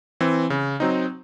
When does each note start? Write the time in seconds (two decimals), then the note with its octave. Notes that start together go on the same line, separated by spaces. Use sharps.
0.20 E3 C4
0.50 C#3
0.80 F#3 C4 D#4